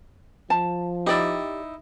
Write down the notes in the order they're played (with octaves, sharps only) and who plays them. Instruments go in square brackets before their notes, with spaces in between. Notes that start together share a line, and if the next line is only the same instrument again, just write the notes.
[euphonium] F3 [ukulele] A5
[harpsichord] D#4 E4 [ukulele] G4 D5